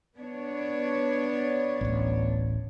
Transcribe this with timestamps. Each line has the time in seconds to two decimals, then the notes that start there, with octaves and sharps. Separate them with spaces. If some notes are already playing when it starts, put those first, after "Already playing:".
0.17 B3 D4 C#5
1.81 D1 A1